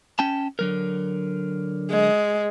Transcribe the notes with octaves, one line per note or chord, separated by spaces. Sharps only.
C#4 G5 A5
D3 F#3 A#4
G#3